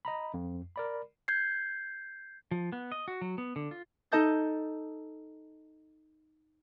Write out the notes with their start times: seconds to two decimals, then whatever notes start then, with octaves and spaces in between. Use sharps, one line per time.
0.05 D#5 A#5 B5
0.34 F2
0.76 A#4 D5 B5
1.28 G6 G#6 C7
2.51 F3
2.72 B3
2.92 D#5
3.08 F#4
3.21 F#3
3.38 B3
3.56 D3
3.71 F4
4.12 D#4 A4 D#5 A5 G6 A6